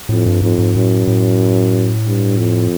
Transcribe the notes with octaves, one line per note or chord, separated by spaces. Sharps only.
F2 A2
G2
F2 G#2
G#2
F#2 A2
A2
G2
F2